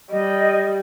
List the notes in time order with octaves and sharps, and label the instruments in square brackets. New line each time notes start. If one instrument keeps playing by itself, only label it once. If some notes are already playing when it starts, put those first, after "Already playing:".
[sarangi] G3 [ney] D#5